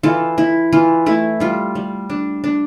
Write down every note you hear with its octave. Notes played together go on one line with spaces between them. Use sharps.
E3 F4 A4
E4
E3 F4
A3 E4
G3 F4
G3
D4
D4